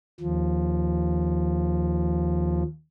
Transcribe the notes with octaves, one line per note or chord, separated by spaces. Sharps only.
D#2 F3